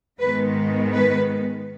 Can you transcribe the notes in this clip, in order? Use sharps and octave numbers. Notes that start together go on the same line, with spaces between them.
G#2 D#3 G#3 B3 B4
B4